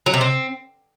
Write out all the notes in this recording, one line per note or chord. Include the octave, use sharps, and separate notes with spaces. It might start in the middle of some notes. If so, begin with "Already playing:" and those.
F#3
C3
C4